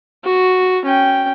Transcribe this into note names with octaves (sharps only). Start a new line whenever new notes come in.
F#4
C#4 G5